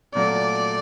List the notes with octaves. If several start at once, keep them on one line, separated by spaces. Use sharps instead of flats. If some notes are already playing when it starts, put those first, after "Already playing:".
A#2 F#3 A3 D5